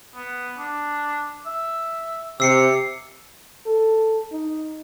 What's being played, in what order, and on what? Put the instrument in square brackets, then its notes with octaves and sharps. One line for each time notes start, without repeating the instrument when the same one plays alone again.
[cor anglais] B3
D4
E5
[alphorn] C3 [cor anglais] G4 [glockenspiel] E6 C7 C#7
[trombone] A4
D#4